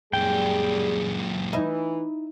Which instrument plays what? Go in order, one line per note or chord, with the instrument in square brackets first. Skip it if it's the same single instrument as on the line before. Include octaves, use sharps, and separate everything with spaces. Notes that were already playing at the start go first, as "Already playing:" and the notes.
[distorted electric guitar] F#2 A#2 [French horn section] G3 G#4 [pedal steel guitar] G5
[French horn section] E3 [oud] D#4 E4